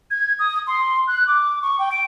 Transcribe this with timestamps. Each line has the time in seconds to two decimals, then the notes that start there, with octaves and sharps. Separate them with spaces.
0.11 G#6
0.39 D#6
0.67 C6
1.07 F#6
1.27 D6
1.62 C#6
1.79 G5
1.92 D7